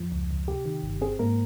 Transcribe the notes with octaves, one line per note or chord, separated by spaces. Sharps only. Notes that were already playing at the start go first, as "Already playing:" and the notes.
Already playing: F2 F3
C#2
C#2
C3 G4
D#3
G1
C4 G#4
G#2 A#3 A#4